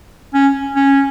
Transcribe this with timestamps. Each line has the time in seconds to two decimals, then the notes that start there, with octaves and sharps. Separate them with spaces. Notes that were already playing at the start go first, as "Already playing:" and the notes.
0.34 C#4
0.76 C#4